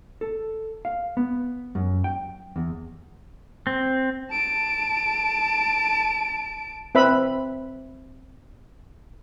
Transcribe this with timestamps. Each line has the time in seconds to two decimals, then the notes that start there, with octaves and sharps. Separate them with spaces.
0.21 A4
0.85 F5
1.17 B3
1.75 F#2
2.04 G5
2.56 E2
3.67 C4
4.31 A5 D7
6.95 C4 B4 E5 B5